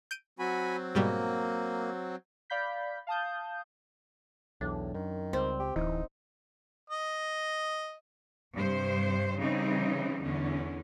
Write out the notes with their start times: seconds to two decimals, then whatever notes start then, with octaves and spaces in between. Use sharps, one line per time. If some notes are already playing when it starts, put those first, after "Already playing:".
0.11 G6 D7 D#7
0.39 F#3 C4 F#4 G#5 B5
0.95 G#2 B2 G3 A#3
2.50 D5 F5 B5 G6 B6
3.07 F5 A5 D#6 G6
4.61 B1 E2 A2 D4
4.94 F#2 D#3
5.33 C#2 G3 C4
5.60 G4
5.76 D1 E3 D#4
6.90 D#5
8.55 G2 C3 C5
9.39 C#3 E3 G3 C4 D#4
10.23 E2 D3 C#4